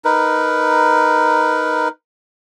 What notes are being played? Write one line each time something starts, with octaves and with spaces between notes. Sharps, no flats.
D#4 A#4 B4